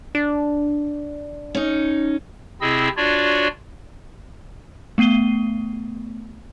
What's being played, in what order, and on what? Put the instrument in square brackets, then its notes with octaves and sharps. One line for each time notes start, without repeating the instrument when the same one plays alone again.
[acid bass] D4
[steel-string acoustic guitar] C#4 D#4
[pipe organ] C3 C4 E4 G#4 D#5 E6
D4 F4 F#4 C#5 D5
[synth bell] A3 B3 C7 D#7 G7